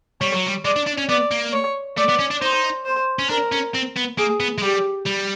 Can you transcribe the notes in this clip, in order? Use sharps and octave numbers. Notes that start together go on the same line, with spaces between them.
G3 C#5
F#3
G3
G#3 D5
D4
D4
C#4
B3 D5
A#3
C#5
A3 D5
B3
C#4
D4
D#4 C5
C5
C#4
D4 A#4
C#4
C4
B3
A#3 G#4
B3
G#3
G3 G4
G3